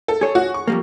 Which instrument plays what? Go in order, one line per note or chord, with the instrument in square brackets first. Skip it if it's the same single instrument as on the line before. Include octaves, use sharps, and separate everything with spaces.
[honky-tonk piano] A4
[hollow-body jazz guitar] G#4 C#5
[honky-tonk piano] F#4
C#6
[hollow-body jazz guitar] F2 G3 A#3